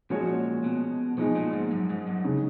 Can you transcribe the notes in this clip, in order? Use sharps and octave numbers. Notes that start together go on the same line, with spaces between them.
A#2 F3 G#3 C#4 F#4 C#5
B2
B2 F3 G#3 D#4 G#4
A#2
G#2
F#2
G#2
F#2
C#3 G#3 D#4